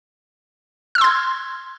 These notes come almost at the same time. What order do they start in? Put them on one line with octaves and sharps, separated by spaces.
F6 E6 C6 G#6